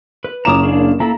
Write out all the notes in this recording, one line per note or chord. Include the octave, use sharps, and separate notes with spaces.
B4
F#1 C#4 A#5 D6 D#6 E7
A#3 D4 G#4
A#3 E4 A4 A#5